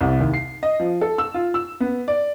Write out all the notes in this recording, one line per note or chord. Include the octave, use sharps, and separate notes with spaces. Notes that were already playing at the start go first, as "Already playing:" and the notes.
C2
D#2
C7
D#5
F3
A4
E6
F4
E6
B3
D5